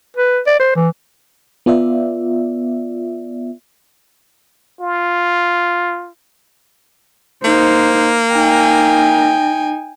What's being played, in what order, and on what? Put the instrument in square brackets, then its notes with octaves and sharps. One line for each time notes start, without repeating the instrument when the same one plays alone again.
[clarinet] B4
D5
C5
E3
[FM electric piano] B3 F4 D5 E5
[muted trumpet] F4
[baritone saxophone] A#3 [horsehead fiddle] D#4 C5
[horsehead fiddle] D#4 [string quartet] G5 G#5